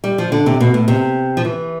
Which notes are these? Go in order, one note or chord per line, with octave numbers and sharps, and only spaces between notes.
G3
F3
D3
C3
B2
A2
C3
F3
E3